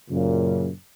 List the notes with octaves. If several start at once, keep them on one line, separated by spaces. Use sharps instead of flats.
F#2 A#2 C#3